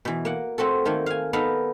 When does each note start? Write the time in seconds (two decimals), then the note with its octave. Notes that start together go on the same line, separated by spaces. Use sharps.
0.05 B2 E3
0.25 A#3 F#5
0.58 A3 C4 F#4 A4
0.85 D#3 A3 A#3
1.06 F5 G#5
1.33 B3 D#4 A4 D#5 F5